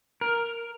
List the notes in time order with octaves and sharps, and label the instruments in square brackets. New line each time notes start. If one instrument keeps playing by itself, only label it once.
[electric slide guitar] A#4